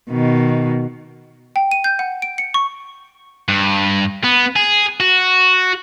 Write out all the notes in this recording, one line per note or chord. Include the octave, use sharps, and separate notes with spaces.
B2 D#3
G5
D#7
G6
F#5
D7
C#7
C#6
G2
B3
G#4
F#4